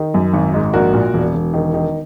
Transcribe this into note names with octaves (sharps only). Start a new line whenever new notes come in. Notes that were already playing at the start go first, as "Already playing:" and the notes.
Already playing: D#3
F#2
G#1
G#2
A#1 F#4 A#4
A#2
E1
E1
D#3
D#3